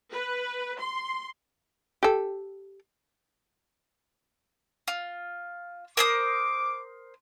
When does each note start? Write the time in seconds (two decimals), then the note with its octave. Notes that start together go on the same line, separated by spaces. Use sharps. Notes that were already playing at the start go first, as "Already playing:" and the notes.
0.12 B4
0.80 C6
2.03 G4 A4
4.88 F4
5.97 A#4 C5 D6 D#6